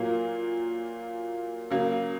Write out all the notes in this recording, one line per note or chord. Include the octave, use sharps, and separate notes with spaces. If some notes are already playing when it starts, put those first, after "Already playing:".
Already playing: A#2 F#3 A#3
C#3 F#3 A#3